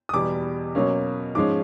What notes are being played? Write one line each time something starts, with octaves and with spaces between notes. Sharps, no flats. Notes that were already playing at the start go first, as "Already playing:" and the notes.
D#6
E2 B2 G3 D6
B2 F#3 A#3 C#4
G#2 F3 G#3 C#4 D6